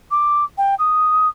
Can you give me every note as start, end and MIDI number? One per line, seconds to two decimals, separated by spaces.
0.11 0.44 86
0.58 0.75 79
0.79 1.29 87